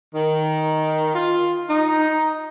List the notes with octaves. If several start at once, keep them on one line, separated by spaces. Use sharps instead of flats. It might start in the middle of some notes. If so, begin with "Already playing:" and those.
D#3
F4
D#4